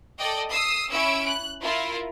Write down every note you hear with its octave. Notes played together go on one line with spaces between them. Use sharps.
A4 D5 D#5 G5
D#6 E6 C7
C#4 E4 E6 D7
F#6
E4 F4 A#4